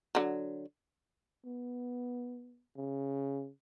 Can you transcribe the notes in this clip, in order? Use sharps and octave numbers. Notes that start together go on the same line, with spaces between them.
D3 F#3
B3
C#3